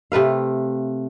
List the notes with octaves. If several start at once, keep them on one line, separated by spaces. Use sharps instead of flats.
C3 A3 B4 F5